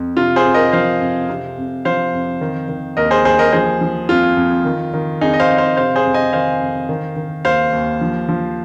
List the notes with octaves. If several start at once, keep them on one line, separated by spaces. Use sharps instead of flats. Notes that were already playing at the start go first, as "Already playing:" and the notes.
Already playing: F2
C3 F4
G#4 C5
F2
A#4 D#5
F3 C5 F5
F2
C3
F2
F3 C5 F5
F2
D#3
D#3
D#2 A#4 D#5
G#4 C5
D#2 G#4 C5
A#4 D#5
F3 G#4 C5
F3
F2 F4
F2
D#3
D#3
F2 D#4 G#4
D#5
C5 F5
F2
C5 F5
C3 C5 F5
G#4 C5
F2
D#5 G#5
D#3 C5 F5
F2
D#3
D#3
D#2 C5 F5
D#2
F3
F3